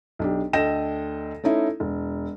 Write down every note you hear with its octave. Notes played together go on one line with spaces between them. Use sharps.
B1 D4 G4
D2 A4 D#5 G5 A#6 E7
A3 C#4 D#4 E4
E1